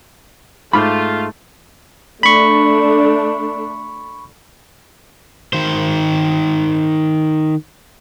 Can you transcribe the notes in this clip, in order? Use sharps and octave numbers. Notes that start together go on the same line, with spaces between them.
G#2 A3 F4 A#4 C5 B5
A3 D4 B5 C#6
D#3 C5